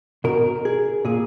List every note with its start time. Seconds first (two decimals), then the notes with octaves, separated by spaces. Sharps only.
0.24 B2 A#4
0.65 G#4
1.05 A#2 G#4